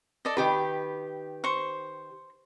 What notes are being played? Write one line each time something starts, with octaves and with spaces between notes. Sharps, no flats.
A4 D5 D#5
D#3 G4 B4 B5
C5 C#6